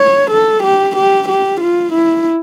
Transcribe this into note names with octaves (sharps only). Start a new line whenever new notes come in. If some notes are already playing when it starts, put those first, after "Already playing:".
Already playing: C#5
A4
G4
G4
G4
F4
E4